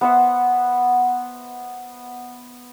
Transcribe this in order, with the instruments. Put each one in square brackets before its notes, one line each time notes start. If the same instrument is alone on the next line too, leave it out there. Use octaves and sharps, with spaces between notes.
[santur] B3 C5 E5 F#5